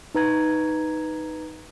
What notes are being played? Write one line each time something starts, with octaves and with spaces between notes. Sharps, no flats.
D#4 B4 A#5 G#6